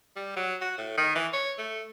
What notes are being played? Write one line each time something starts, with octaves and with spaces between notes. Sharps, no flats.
G3
F#3
F#4
A2
D#3
E3
C#5
A3